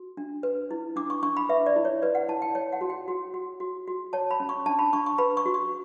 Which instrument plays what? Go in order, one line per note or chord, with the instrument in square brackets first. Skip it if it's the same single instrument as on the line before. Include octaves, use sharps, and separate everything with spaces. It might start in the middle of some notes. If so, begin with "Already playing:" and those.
Already playing: [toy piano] F#4
D4
B4
E4
D4 D6
C#6
D4 C#6
B5
B4 E5
D5
E4
C#5
B4 D5
F#5
E4 A5
G5
C#5 G5
F#5
F#4
G5
F#4
F#4
F#4
F#4
C#5 A5
B5
C#4
C#6
D4 A5
B5
D4 C#6
C#6
B4 B5
C#6
F#4
C#6